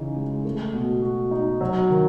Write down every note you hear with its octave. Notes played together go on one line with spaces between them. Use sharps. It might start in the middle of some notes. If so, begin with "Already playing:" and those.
Already playing: C#3 E3 D#4
G#3
A3
B2
F#4
D#4
F#3
D#3